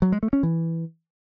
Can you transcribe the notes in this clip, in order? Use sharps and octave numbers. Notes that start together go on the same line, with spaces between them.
F#3
G#3
A3
C#4
E3